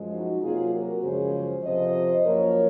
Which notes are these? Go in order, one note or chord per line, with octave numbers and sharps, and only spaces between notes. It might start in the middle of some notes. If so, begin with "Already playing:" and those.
Already playing: F#2 F3 G#3
D#4 F#4
C3 F#3 A#3 F4 G#4
F#4 A#4
F#2 C#3 F3 G#3 G#4 C5
F2 C3 F3 C5 D#5
F#2 F3 A#3 A#4 C#5